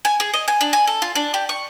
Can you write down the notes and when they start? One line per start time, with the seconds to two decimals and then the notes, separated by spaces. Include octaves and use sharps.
0.05 G#5
0.20 G#4
0.34 D#5
0.48 G#5
0.61 D4
0.73 G#5
0.87 A4
1.02 F4
1.15 D4
1.34 G4
1.49 C#6